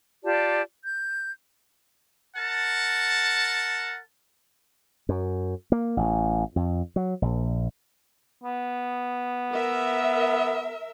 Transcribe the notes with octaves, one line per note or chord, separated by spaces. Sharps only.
F4 G4 D5 A5
G6
A#4 F#5 A5
F#2
A#3
A1
F2
F#3
A#1
B3
A#4 E5